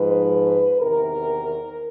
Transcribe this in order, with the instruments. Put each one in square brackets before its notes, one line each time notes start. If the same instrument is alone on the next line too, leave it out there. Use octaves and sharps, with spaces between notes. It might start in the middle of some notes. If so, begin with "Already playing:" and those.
Already playing: [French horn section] G#2 F3 B4
E2 C3 D#3 A#4